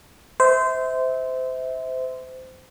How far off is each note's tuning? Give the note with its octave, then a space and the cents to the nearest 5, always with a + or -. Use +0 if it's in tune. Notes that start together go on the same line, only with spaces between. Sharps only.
C5 -20 E5 -25